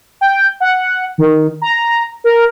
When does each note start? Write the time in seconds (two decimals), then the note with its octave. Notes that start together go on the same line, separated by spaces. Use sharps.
0.21 G5
0.60 F#5
1.18 D#3
1.62 A#5
2.24 A#4